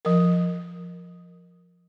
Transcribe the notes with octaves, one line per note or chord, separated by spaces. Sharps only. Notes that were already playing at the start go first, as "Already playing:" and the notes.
F3 A#4